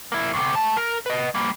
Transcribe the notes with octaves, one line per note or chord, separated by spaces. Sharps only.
A#3 E4
D2 C3
A3 A5
A#4
B4 D#5
G3 A#3